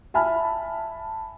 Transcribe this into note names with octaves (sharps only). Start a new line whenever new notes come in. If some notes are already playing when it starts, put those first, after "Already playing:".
E5 G#5 A5 B5 F6